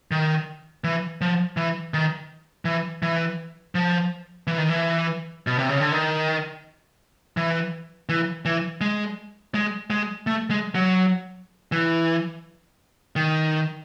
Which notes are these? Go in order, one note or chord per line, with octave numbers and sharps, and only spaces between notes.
D#3
E3
F3
E3
D#3
E3
E3
F3
E3
D#3
E3
B2
C3
C#3
D3
D#3
E3
E3
E3
G#3
G#3
G#3
A3
G#3
F#3
E3
D#3